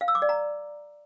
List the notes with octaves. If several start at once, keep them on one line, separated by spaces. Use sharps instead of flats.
F5
E6
D6
D5
A#5